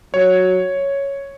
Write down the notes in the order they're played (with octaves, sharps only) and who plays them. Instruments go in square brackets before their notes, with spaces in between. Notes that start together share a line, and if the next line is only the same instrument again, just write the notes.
[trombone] F#3 [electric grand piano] C#5